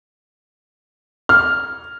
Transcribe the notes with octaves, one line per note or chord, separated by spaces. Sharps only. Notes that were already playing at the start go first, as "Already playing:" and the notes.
F6